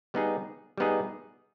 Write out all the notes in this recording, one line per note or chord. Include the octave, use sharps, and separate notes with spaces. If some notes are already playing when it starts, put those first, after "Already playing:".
G3 B3 D#4 G#4
G3 B3 D#4 G#4